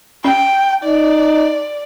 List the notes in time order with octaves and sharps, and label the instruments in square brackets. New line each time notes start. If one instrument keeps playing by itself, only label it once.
[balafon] C#4 [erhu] G5
[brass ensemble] D#4 [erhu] D5